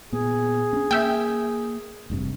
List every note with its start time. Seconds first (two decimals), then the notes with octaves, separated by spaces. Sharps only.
0.12 A#2 B3 G#4
0.73 C4 C#4
0.91 A#3 E5 G5
2.10 F1 G2 C3